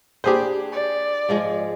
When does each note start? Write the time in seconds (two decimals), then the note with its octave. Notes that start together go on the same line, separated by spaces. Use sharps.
0.24 D4 G4 G#4 B4 C5
0.72 D5
1.29 G#2 F3 G#3